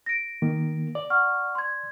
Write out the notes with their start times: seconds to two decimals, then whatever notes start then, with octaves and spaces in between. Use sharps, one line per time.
0.06 A#6 D7
0.42 D#3 A#3
0.95 D5
1.10 F#5 C#6 F6
1.55 C6 G#6